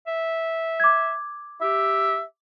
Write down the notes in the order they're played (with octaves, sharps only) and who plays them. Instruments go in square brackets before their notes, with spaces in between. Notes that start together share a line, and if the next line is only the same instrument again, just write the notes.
[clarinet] E5
[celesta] D6 G#6
[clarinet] G4 [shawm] E5